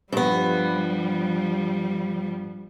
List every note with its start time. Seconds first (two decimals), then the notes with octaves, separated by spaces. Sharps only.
0.12 G2 F3 G3 B3